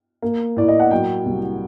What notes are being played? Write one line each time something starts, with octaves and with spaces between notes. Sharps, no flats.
A#3
A2 D5
D#5
F#5
F#3 G5
C2